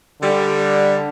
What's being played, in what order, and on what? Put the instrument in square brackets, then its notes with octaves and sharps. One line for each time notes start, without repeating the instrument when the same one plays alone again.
[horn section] D3 G3